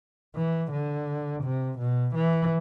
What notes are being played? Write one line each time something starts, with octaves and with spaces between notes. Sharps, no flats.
E3
D3
C3
B2
E3